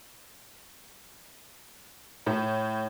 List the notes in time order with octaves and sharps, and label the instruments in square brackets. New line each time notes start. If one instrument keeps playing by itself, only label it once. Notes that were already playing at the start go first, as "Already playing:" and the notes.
[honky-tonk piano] A2